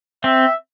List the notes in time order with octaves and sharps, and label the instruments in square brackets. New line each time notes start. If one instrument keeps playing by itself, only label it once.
[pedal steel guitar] C4 [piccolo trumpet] E5